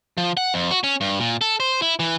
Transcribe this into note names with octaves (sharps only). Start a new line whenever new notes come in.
F3
F#5
F2
F#4
C#4
G2
A#2
A4
C5
E4
E3